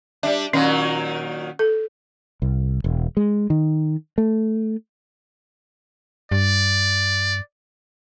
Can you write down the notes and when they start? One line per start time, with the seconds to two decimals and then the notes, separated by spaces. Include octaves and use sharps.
0.23 G3 D4 D5 E5
0.53 A#2 D#3 F#3 C#4
1.59 A4
2.42 C2
2.84 E1
3.17 G#3
3.50 D#3
4.18 A3
6.31 G2 D5